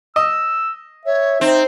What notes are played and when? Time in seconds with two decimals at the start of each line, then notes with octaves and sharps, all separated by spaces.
0.16 D#5 E6
1.06 C#5 E5
1.41 C4 D#4